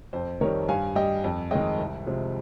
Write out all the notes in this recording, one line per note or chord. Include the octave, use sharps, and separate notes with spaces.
F2 C5
D#3 G3 A#4 C#5
G2 F5 G#5
G3 D#5 G5
F2
D#3 G#3 D#5 G5
C2
C3 F3 G#3